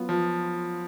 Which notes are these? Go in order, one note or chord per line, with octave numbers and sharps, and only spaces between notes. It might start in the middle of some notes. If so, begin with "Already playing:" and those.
Already playing: F#3 B3 F4
F3